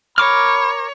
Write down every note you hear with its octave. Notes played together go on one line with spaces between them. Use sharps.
A#4 C#5 B5 D6 F6